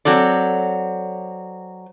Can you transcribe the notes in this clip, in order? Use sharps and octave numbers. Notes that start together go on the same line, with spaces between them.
F#3 C4 A4 D5